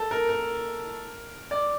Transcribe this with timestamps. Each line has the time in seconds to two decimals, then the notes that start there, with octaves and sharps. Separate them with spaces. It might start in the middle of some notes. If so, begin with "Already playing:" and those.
Already playing: A4
0.11 A#4
0.29 A#4
1.51 D5